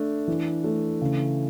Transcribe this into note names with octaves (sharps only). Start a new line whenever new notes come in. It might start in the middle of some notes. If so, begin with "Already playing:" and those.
Already playing: A3 D4
E3
A3
C#3